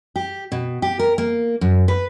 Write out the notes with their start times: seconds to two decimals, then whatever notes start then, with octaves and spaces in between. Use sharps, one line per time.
0.16 G4
0.52 B2
0.82 G4
0.99 A#4
1.18 A#3
1.61 F#2
1.88 B4